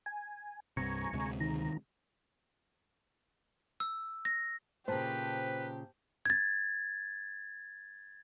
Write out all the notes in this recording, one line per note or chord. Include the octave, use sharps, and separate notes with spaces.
G#5
C2 G2 C3 G#5 A#5 C#6
D2 C3 G#3
D#3 A#5
E6
A#6
A#2 C#3 G4 B4 C5 A5
G#6 A6